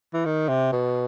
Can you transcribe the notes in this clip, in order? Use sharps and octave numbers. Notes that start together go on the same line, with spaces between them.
E3
D#3
C3
B2